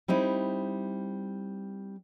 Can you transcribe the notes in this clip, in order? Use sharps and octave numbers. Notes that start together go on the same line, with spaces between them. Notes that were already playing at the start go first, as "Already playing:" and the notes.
G3 C4 D#4 E4